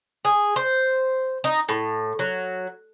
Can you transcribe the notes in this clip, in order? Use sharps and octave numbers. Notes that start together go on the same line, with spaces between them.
G#4
C5
D#4
A2
F#3